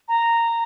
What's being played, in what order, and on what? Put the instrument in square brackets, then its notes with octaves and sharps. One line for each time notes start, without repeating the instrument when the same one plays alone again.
[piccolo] A#5